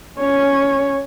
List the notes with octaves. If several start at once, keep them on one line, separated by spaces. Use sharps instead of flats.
C#4 C#5